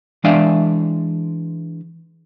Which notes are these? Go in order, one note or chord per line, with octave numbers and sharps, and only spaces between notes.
E3 G#3 D4 D5 E5 F5